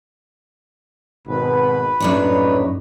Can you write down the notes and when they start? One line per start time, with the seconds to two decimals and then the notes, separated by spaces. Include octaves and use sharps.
1.27 G#1 B2 B4
2.00 A#1 F#2 A2 D4 D#4 C#5